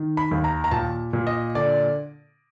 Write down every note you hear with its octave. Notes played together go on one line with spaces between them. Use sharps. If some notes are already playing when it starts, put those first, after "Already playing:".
Already playing: D#3
B5
D#2
A#5
A#5
A#2 A5
A#2
D#5
D3 D5